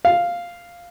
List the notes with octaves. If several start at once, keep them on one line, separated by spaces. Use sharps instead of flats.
F5